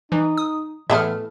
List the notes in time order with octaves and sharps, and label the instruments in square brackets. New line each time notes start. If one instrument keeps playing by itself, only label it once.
[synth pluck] E3 [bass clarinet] D#4
[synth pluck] D#6
[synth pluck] A2 F6 [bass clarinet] E3 [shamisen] A3 B3 E5